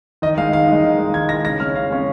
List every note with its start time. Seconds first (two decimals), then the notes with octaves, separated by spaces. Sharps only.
0.22 D#3 D#5
0.38 G#3 F5
0.41 D#4
0.52 D#3 F5
0.68 G#3 D#4
0.84 D#3
0.98 G#3 D#4
1.14 D#3 G#6
1.29 D#4 A#6
1.34 G#3
1.45 C#3 A#6
1.60 G#3 C#4 F6
1.75 C#3 F5
1.90 G#3 C#4